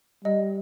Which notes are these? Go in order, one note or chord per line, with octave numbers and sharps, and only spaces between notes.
G3 D#5